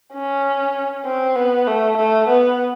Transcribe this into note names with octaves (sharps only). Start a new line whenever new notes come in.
C#4
C4
B3
A3
A3
B3